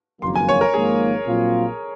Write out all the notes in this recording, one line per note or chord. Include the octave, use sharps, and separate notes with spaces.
F#1 F2 D#3 F#3 A#3 C6
G#5
C#5
A#4
G#1 G#2 F3 A#3 G#4
A#1 A#2 F#3 C4 F4